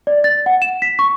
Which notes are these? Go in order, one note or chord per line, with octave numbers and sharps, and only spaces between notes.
D5
A6
F#5
E7
B6
C#6